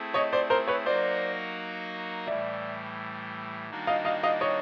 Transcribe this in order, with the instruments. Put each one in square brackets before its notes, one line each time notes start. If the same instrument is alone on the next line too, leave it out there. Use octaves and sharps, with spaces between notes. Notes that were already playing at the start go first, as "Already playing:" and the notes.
Already playing: [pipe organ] A3 C4 E4 G#4
[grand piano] C#5 D#5
C5 D5
A#4 C5
B4 C#5
[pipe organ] F#3 A#3 D#4 F#4 A#4 [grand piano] C5 D5
[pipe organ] A2 E3 G3 [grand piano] D5 E5
[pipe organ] D#3 G3 A#3 D4 F#4
[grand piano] D#5 F5
D#5 F5
D#5 F5
C#5 D#5